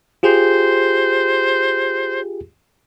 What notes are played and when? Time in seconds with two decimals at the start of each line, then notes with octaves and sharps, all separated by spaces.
0.23 F4 G4 G#4 C5